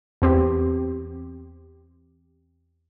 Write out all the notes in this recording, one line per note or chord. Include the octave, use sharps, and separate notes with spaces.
E2 C4 G4